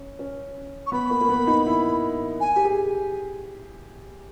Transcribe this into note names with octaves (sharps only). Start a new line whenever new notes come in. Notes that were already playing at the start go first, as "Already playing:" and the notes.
Already playing: C#4
C#4
C#6
B3 B5
A#3
A#3
B3
D#4
E4
G#5
G4
G#4